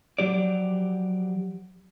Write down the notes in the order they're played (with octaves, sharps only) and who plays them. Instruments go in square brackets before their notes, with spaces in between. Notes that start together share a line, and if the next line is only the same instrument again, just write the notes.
[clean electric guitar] F3 F#3 G4 D5